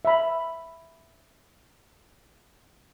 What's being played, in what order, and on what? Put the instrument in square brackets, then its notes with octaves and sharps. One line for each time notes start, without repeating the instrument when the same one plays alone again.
[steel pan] E5 B5